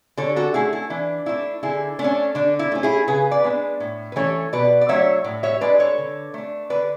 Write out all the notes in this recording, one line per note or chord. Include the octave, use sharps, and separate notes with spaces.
D3 A4 C#5
F#4 A4
A3 C#4 E4 G#4
E4
E3 D4
A3 D4 E4
D3 E4 G#4
A3 D4
C#4
D3 D4
E4
A3 C#4
E4 G#4
C#3 G#4 B4
B4 D5
G#3 B3 D4
A2
B4
E3 A3 C#4 A4 C#5
B2 B4 D5
D5
F#3 A3 D4 C#5 E5
A2
C#5 E5
G#3 D4 B4 D5
A4 C#5
D3
A3 D4
D3 B4 D5